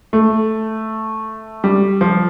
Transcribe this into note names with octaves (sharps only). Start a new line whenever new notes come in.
A3
G3
F3